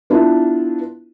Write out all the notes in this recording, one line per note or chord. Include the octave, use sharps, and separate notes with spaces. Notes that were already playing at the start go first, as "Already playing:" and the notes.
B3 D4 E4 F4